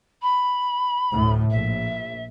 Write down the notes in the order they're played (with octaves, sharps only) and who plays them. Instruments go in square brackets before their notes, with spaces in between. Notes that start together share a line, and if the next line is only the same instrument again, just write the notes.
[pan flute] B5
[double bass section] D2 A2
[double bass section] A#1 [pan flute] E5